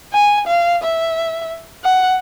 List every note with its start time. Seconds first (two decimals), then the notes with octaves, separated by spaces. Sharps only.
0.13 G#5
0.47 F5
0.83 E5
1.84 F#5